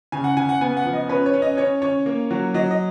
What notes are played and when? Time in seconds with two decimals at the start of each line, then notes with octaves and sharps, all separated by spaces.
0.12 C#3 G#5
0.24 F#5
0.37 C#3 G#5
0.49 F#5
0.61 B3 G#5
0.77 F#5
0.85 F3
0.93 D#5
1.09 C#4 B4
1.26 C#5
1.34 C#4
1.42 D#5
1.57 C#4 C#5
1.82 C#4 C#5
2.06 A#3
2.31 F#3
2.54 F#3 D#5
2.71 D#5